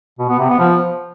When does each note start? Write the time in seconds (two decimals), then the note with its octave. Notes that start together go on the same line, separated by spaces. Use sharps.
0.19 B2
0.29 B3
0.39 C3
0.49 B3
0.59 F3